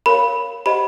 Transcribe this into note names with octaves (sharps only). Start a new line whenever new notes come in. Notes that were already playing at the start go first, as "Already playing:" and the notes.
A#4 C#5 F5 B5
G4 C5 D#5 F#5 B5